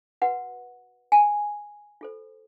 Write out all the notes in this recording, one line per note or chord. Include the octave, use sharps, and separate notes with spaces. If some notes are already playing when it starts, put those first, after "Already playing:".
F#4 B4 F#5
G#5
F4 A4 C5